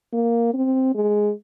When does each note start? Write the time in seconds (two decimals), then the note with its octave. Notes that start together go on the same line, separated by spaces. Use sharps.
0.13 A#3
0.54 C4
0.95 G#3